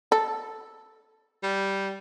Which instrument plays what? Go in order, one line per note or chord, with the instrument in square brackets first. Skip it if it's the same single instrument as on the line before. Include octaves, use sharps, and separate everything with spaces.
[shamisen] A4
[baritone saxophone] G3